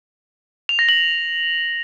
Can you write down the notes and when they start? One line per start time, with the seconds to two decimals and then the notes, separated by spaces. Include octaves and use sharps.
0.69 F7
0.79 A#6
0.89 F#7